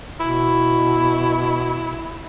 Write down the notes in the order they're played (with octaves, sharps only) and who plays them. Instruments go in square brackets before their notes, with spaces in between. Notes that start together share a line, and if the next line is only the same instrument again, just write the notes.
[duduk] B2 [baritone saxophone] E4